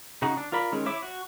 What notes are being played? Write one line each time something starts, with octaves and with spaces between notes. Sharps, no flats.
C#3 D#4 F#4 G#4
D4
F4 A#4 D5 B5
D#3 G#3 C#4
E4 C#5 E5 D6
F#4